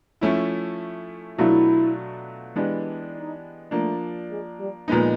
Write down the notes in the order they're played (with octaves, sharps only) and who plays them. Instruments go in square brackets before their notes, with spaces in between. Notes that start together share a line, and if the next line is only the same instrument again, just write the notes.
[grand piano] F3 A3 C#4 E4
[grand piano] B2 F#3 A3 D4 F4 [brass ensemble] E4
[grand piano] E3 G#3 B3 D4 G4
[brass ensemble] D#4
[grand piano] F3 A#3 D4 [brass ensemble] A3
[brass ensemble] G#3
G3
[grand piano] A#2 F3 G#3 B3 D#4